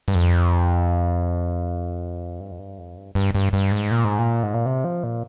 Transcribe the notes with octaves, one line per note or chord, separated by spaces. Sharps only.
G2
F2
G2
F2
G2
F2
G2
G2
G2
G2
G#2
A#2
G#2
A#2
G#2
A#2
C3
F3
A#2